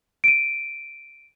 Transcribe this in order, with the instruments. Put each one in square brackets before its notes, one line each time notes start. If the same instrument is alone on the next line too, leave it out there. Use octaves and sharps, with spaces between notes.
[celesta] D7 D#7